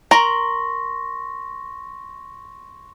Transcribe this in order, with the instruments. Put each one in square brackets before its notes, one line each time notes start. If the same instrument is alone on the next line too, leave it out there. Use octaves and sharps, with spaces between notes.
[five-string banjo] A#4 A#5 [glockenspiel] C6 C#6 A#6